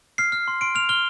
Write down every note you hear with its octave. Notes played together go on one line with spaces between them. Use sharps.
F6 C7
F6
C6
C6 D7
F6 F7
F6 G7